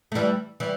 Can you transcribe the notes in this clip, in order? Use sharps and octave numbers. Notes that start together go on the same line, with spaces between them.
A3
E3 G3
E3 G3